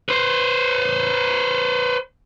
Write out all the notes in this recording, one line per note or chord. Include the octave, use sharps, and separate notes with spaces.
B4 C5